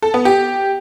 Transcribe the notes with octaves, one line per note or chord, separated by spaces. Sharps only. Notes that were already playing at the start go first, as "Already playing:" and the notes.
A4
B3
G4